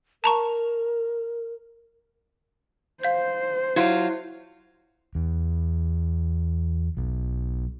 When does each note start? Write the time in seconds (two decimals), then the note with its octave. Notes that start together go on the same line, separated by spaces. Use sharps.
0.24 A#4 A5 A#5 C#6
3.04 C5 F5 G6
3.76 F#3 E4 F4
5.15 E2
6.97 B1